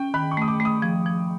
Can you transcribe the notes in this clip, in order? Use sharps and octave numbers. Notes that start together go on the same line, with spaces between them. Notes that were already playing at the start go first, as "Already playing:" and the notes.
Already playing: C#4 G5
D#3 B5
C#6
A3 D#6
D6
A3
D#6
F3
F3